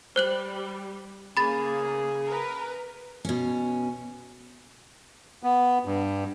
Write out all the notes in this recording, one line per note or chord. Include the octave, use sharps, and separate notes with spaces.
G3 C5 F#6 F#7
C#3 A#3 G#4 B5 A6
A#4 B4
B2 C#4
B3
G2